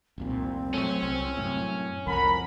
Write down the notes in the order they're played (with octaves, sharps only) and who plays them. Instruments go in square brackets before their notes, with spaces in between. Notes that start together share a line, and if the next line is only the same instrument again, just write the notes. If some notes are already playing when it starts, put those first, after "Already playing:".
[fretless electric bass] F1 C2 A#2 [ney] C4
[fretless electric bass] F#3 A3 [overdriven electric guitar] C#4 C#5
[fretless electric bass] C2
F#2 A2
[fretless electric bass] C2 F2 [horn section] A#4 B5 [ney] F#5